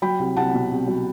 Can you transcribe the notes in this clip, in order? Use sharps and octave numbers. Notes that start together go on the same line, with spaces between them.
F#3 G5 B5
C2
C2 F#5 A5
B2
C2
F#3